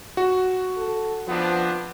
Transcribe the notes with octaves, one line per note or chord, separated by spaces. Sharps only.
F#4
A4
F3 B3 C4 D4